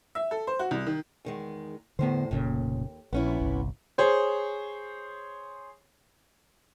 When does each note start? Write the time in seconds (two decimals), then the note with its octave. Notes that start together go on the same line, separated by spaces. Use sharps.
0.15 E5
0.31 A4
0.47 C5
0.59 F#4
0.71 C2
0.86 D#3
1.25 E2 D#3 G#3
1.99 E2 A2 D3 B3 C5
2.31 F1 D#2 A#2 C#3
3.13 A#1 B3 C#4 E4
3.40 G1 C2
3.98 G#4 C5 C#5